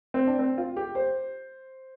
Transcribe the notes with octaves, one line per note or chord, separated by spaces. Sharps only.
C4
D4
C4
F4
G4
C5